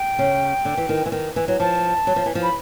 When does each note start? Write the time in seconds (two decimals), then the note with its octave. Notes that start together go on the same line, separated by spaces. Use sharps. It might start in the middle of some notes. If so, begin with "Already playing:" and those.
Already playing: G5
0.19 C#3
0.65 D3
0.77 E3
0.89 D#3
1.06 E3
1.12 D#3
1.36 E3
1.48 F#3
1.60 F3 A5
2.07 F#3
2.16 F3
2.26 E3
2.35 F3
2.43 B5